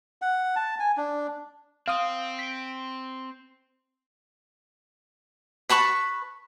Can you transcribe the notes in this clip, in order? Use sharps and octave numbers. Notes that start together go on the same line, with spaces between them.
F#5
A5
G#5
D4
C4 F5 D#6
B6 D7
B4 A5 B5 C#6